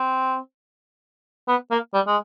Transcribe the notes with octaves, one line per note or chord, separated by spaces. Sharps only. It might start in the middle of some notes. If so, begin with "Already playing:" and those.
Already playing: C4
B3
A#3
G3
G#3